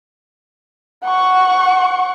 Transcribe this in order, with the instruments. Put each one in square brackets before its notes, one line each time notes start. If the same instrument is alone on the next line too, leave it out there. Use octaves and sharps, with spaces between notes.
[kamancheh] F#5 C#6